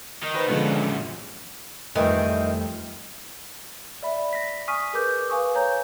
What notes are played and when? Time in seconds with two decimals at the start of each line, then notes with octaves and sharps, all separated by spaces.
0.23 D#3 D#4
0.34 B4 C5 B5
0.48 B2 D3 F3 G#3 B3
0.61 F#2 A#2
1.95 F2 D#3 E3 G3 A3 C4
4.03 D5 E5 B5
4.33 A#6 B6
4.68 G#5 C#6 D#6 F6 B6 D#7
4.93 G#4 A#4 B4 D6 G6
5.29 B4 F5 G#5 C#6 D#6
5.55 C#5 F5 G#5 A#5 G6